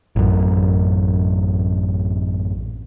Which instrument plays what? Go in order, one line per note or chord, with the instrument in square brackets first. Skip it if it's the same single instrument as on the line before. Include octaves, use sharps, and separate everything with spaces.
[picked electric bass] A1 F#2